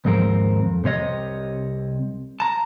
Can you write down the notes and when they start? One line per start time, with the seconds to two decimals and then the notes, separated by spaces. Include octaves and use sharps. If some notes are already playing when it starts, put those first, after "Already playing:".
0.05 D#2 G#2 F3 C4 A#4
0.63 F2
0.84 C2 C3 C#5 D#5
2.40 A5 A#5